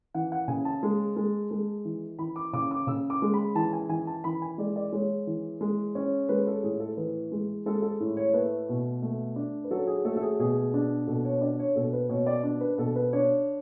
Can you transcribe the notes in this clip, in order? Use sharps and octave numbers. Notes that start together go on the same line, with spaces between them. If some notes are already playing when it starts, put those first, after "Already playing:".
E3 F#5
F#5
C#3 G#5
A5
G#3
G#3
G#3
E3
E3 B5
D6
C#3 D6
D6
C#3 E6
D6
G#3
B5
E3 A5
G#5
E3 G#5
A5
E3 B5
G#5
G#3 D5
D5
G#3 C#5
E3
G#3
C#4
G#3 B4
A4
A2 G#4
A4
E3 B4
G#3
G#3 A4
A4
A2
C#5
A3 B4
B2
A3
D4
B4
F#3 A4
G#4
A3 A4
A4
G#4
B2 G#4
D4
B2 A4
C#5
D4 D5
C#5
B2 A4
B4
B2 C#5
D5
D4
B4
B2 A4
B4
D4 C#5